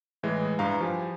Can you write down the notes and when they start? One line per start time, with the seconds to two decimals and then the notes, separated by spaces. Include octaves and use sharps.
0.23 A2 E3 G#3
0.59 G2 E4 B4 F5 A#5
0.80 F3 G4 G#5